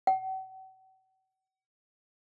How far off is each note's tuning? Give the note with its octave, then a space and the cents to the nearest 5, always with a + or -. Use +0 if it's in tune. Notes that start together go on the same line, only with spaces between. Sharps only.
F#5 +40